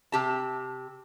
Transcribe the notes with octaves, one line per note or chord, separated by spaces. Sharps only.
C3 G4 A5